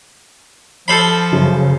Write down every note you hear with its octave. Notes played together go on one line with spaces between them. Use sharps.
F3 A4 C5 B5
F#2 C#3